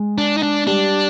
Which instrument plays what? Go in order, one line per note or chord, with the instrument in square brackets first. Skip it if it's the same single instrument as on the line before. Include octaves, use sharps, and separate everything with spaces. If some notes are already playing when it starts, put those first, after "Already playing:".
Already playing: [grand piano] G#3
[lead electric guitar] D4
D#4
D4
[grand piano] G3 [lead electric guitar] D4